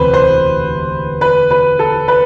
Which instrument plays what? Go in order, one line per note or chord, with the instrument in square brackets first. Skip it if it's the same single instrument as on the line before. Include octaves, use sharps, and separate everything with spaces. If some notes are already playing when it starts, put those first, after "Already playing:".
Already playing: [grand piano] E1 D2 C3 [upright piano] B4 C5
[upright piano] C5
B4
B4
A4
B4